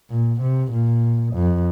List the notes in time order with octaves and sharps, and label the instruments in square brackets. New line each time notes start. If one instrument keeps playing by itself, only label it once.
[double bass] A#2
C3
A#2
F2